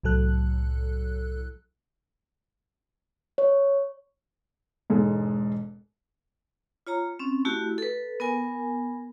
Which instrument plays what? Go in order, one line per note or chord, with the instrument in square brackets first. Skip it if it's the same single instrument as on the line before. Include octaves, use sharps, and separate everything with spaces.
[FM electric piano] C2 A2 F#3 A4 F#6
[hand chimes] C#5
[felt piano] E1 G#2 G#3 A4
[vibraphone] F4 C#5 A#5
C4 C#4
A3 E4 F#4 G4
A4 B4
B3 A#4 G#5